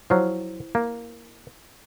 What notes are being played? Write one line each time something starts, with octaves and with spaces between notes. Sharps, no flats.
F3 F#3 E4 C5 F6
A#3